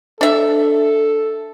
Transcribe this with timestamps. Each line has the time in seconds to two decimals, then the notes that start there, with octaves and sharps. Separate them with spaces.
0.21 D4 A4 E5